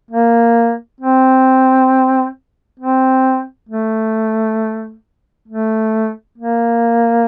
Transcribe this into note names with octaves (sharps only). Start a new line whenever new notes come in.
A#3
C4
C4
A3
A3
A#3